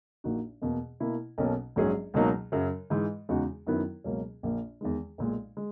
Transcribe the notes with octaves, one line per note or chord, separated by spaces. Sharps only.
A#1 A#2 A#3 D#4 F#4
E2 B2 A#3
B2 A#3 E4
B1 B2 A#3 C#4
A#1 G#2 F#3 C#4 G#4
C#2 B2 F#3 A#3 D#4
F#2 C#3 F#3
G#2 E3 G#3
E2 C#3 G#3 D#4 F#4
F#2 D#3 F#3 B3 E4
C#2 B2 F#3 A#3 C#4
A#1 A#2 A#3
E2 D#3 G#3
B1 A#2 G#3
G#3